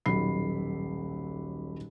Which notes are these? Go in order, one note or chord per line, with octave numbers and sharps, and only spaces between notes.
D#1 B1 F#3 F#4 B5 C7